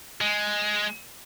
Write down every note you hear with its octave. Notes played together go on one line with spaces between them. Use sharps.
G#3